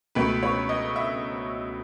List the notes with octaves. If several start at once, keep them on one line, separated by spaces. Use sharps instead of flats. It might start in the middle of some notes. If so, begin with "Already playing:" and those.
C#2 B2 F#3 A3 B4
C#5
D#5
E5